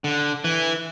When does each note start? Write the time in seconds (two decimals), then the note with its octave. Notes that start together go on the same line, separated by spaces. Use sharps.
0.04 D3
0.44 E3